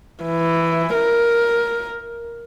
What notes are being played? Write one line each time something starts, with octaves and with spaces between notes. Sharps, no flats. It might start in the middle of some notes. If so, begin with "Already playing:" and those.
E3
A#4